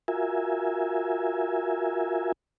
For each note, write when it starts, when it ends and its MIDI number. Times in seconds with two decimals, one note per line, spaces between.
0.08 2.32 65
0.08 2.32 66
0.08 2.32 70
0.08 2.32 76
0.08 2.32 80